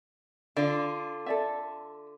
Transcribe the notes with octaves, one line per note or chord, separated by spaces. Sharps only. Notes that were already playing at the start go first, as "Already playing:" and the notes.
D3 F4 D5
A4 D5 E5